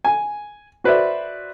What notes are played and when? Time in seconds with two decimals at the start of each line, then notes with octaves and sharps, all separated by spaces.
0.05 G#5
0.84 F#4 B4 C5 D5 E5